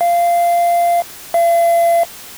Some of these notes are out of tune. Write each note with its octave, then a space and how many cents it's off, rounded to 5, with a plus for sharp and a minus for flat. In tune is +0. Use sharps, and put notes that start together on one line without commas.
F5 -15
F5 -45